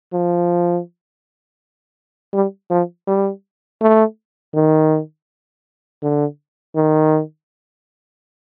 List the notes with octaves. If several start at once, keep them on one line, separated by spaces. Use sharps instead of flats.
F3
G3
F3
G3
A3
D#3
D3
D#3